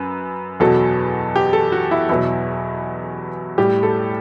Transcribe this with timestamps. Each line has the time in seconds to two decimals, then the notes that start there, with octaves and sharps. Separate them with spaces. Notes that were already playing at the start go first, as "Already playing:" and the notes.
Already playing: F#2 B4
0.60 E2 B2 F#3 A4
1.36 G4
1.53 A4
1.72 F#4
1.91 E4
2.09 E2 B2 F#3 E4
3.58 A2 G3 G4
3.83 A4